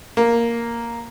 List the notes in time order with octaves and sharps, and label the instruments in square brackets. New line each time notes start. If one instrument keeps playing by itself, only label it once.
[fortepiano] A#3